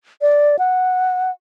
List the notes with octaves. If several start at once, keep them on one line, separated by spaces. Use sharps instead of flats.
D5
F#5